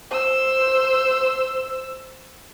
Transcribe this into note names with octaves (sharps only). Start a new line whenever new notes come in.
C5 E6